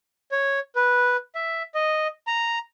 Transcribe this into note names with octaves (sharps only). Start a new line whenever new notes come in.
C#5
B4
E5
D#5
A#5